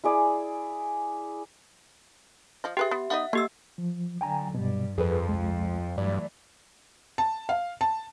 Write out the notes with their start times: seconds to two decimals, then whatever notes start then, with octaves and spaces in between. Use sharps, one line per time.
0.04 E4 G#4 D5
2.64 F3 D#5
2.77 G4 G#4 B4 E5 G5
2.91 B3
3.10 B3 D#4 D#5 E5 F#5
3.33 A3 A#3 G4 E6
3.78 F3
4.21 D3 F#3 G5 G#5 A#5
4.54 G2 B2 G3
4.98 F2 F3 G#4 A4 B4
5.28 C2 G#3
5.98 G2 E3 F#3 A3 D5
7.18 A5
7.49 F5
7.81 A5